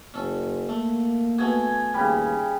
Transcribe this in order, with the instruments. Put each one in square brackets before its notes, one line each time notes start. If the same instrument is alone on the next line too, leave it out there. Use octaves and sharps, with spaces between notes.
[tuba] F#1 [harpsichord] C#4 A4
[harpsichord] A3 [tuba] A#3
[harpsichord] A3 B3 F#4 [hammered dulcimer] G#5
[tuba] D#2 [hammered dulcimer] C#3 G3